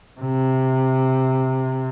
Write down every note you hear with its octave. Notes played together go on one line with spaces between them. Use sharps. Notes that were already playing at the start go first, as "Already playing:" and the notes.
C3